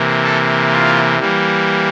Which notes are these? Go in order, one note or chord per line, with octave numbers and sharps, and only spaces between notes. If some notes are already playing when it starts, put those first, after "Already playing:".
Already playing: C3 E3 A#3
A4
F4
E3 G3 A#3